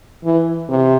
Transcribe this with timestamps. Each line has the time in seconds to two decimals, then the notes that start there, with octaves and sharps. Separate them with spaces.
0.24 E3
0.69 C3